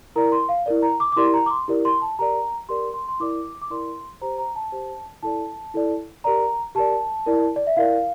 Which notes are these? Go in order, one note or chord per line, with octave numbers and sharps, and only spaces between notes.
E4 A#4 D5 A#5
C6
F5
E4 A#4 D5
A#5
D6
D6
E4 G4 A#4 D5 C6
A#5
D6
C6
E4 G4 A#4 D5
C6
A5
G4 A#4 D5 A#5
G4 A#4 D5 C6
C6
C6
E4 A#4 D5 D6
D6
E4 A#4 D5 C6
G4 C5 A#5
A#5
A5
G4 C5
E4 A4 D5 A5
E4 A4 D5
G4 A#4 D5 A#5
G4 A#4 D5 A5
E4 A#4 D5
D5
E5
E4 A#4 D5 F5